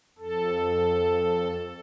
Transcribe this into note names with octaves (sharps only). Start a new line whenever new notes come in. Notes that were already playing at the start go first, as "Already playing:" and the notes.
F2 A4